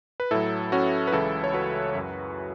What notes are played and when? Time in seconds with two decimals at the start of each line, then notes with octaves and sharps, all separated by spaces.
0.20 B4
0.31 A2 F#3 E4 A4
0.72 C#4 F#4
1.07 B4
1.12 C#2 C#3 E3 E4 A4
1.44 C#5
1.53 F#4 B4
1.95 F#2 F#3